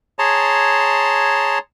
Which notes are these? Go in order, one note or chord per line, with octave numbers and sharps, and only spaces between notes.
G#4 C#5 A5 A#5 C6